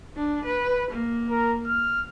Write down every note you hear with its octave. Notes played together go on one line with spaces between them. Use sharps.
D4
B4
A#3
A#4
F6